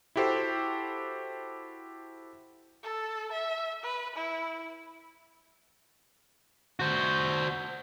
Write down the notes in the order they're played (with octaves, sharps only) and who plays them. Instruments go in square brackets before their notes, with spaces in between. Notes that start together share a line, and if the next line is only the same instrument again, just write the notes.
[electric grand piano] E4 F#4 G4 A4 C5
[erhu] A4
E5
B4
E4
[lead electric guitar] F#4 C5